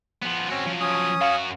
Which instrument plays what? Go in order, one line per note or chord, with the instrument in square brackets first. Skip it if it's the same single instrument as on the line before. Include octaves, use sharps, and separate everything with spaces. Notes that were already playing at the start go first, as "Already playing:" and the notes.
[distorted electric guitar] F3 B3
[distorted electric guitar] C4 F#4 [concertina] C#4
[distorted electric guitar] F3 F#3
[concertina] C#4 D#6
[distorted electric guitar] F#2 F#4 [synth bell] F5